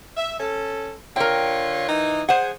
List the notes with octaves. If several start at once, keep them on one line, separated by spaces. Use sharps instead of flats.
E5
C#4 A4
D3 F4 A#4 C#5 G5
E3 D#4
G#4 C5 F#5